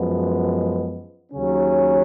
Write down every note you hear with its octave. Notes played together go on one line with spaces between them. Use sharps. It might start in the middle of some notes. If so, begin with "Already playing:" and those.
Already playing: F#2 F3 G#3 B3
D#2 C#3 F#3 C#4